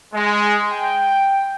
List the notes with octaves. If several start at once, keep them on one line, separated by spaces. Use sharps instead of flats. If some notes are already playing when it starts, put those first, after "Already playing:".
G#3
G5